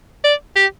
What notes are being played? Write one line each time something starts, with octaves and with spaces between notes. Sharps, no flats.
D5
G4